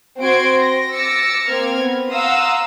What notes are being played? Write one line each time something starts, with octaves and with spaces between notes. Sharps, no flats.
C4 F#4 C5 C6 G#6 D7
A#6
D6 E6 A6 A#6 C#7
A#3 C4 F6 G#6
B3
F5 F#5 A#5 C6 D#6 E6